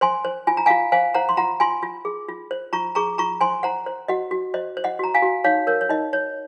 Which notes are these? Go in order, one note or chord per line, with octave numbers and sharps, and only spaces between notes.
C5 G#5 C6
C5
F4 G#5
A#5
F4 F5 G#5
C5 F5 G#5
C5 F#5 A#5
C6
F4 F#5 A#5
F4 G#5 C6
F4
G#4
F4
C5
F4 A#5 C#6
G#4 A#5 C#6
F4 A#5 C#6
C5 G#5 C6
C5 F#5 A#5
C5
F#4 D#5 F#5
F#4
C5 D#5
C5
D#5 F#5
F#4 A#5
F5 G#5
F#4
D#4 C#5 F5
A#4 C#5
C#5
D#4 D#5
C#5